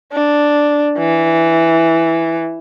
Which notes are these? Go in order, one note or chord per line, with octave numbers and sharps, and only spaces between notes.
D4
E3